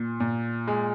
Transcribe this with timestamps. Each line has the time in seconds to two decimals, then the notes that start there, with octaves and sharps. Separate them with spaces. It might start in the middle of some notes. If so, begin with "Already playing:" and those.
Already playing: A#2
0.20 A#2
0.67 G#3